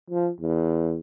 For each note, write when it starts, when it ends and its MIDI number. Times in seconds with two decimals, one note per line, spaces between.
0.10 0.29 53
0.40 1.00 40